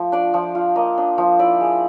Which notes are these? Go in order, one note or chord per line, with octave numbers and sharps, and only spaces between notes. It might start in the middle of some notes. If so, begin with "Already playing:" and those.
Already playing: F3 A3
D4 D5
F3
F4
A#3 D#5
D4
F3
E4 D5
G#3